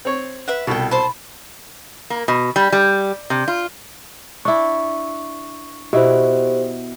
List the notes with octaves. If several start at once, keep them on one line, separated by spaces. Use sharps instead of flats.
C4 C#5
B4 E5 F#5
C2 B2 A4 G5
C5 A5 B5
A#3
B2
G3
G3
C3
F4
D4 E4 C#6
B2 E4 G4 C5